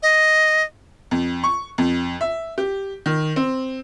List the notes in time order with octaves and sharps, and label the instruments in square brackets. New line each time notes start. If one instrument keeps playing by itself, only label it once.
[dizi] D#5
[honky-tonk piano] F2
C#6
F2
E5
G4
D#3
C4